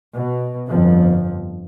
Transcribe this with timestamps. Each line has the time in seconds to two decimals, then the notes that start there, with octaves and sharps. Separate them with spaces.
0.14 B2
0.68 G1 F2 F3